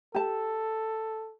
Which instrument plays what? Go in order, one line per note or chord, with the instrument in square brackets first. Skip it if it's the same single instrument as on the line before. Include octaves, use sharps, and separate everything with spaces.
[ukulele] G4 A5 [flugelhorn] A4